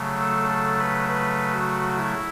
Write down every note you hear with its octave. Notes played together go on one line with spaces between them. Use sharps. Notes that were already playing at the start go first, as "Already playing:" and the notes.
Already playing: C#3 F#3 A3
A4
A4
B4
B4
F#4
E4